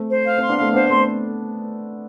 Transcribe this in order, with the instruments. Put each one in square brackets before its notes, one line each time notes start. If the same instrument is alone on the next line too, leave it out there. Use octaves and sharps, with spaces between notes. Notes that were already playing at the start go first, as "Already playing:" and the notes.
Already playing: [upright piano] A3 C4
[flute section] C5
F5
[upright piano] A3 C4 [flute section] C6
[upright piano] B3 D4
[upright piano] A3 C4 [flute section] F5
[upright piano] B3 D4 [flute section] C5
[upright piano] A3 C4 [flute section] C6